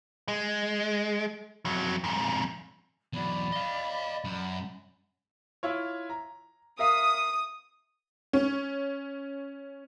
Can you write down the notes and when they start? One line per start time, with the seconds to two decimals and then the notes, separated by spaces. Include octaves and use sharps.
0.28 G#3
1.65 F2 F#3
2.04 F2 G#2
3.13 E2 F#3 D5 B5
3.52 D#5 F5
4.24 F#2
5.63 E4 F4 C#5
6.09 A#5
6.79 A#4 E5 F5 D#6
8.33 C#4